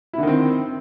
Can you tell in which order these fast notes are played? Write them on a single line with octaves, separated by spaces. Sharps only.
E4 D3 D#3 C4